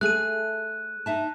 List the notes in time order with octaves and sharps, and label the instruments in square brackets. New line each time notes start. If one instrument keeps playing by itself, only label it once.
[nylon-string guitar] A3 G#4 [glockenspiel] F#6 D#7
[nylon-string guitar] D#4 E5 A5